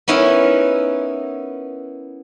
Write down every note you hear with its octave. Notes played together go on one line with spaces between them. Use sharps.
B3 C#4 D#4 E4 A#4 D#5